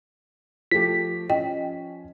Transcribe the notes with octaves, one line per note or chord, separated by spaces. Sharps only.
F3 A3 G4 B6
F3 C#4 D#5 G5